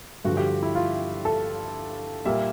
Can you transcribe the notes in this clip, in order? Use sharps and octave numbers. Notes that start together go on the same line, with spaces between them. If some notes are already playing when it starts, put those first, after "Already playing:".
G2 D3 F3 F#4
G4
E4
F4
A4
A#2 G3 A#3 E5